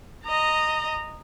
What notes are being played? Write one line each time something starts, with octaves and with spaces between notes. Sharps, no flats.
D#5 A#5